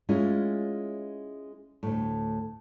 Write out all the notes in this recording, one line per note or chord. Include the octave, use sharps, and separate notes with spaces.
G#3 C#4 E4 F4
D2 A2